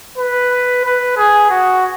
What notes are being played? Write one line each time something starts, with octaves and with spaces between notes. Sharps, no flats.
B4
B4
G#4
F#4